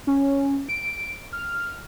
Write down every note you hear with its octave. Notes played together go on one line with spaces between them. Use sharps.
C#4
D7
F6